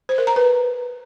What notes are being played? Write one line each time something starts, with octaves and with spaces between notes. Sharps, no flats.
C5
A#4
A#5
B4